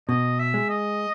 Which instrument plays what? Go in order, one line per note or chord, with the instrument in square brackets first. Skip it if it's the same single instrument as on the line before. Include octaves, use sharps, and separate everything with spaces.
[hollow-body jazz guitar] B2 [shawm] D#5
[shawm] E5
[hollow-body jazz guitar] G#3
[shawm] D#5